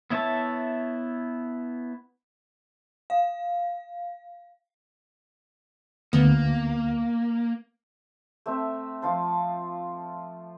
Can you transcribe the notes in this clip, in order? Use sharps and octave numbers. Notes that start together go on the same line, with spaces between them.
B3 E4 C#5 E5 A5
F5
D2 A#3 B3
A3 C4 E5
F3 F4 C5 A5